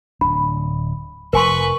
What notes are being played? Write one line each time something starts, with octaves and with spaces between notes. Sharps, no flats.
D1 D4 B5
F1 D3 F3 A#4 B4 G#5 C6 C#6